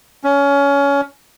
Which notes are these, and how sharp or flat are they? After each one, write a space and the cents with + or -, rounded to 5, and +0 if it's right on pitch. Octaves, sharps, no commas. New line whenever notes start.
C#4 +20